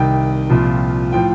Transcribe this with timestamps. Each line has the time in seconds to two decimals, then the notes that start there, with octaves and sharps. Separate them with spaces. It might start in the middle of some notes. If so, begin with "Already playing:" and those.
Already playing: C2 C3 D#3 G5
0.50 C2 A#2 F3
1.12 A2 F3 G5